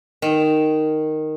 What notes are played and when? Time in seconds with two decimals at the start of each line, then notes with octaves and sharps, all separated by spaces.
0.22 D#3